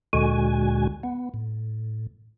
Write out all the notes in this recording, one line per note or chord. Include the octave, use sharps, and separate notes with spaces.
D2 A#2 D3 G#3 F#4 G#5
B3
A2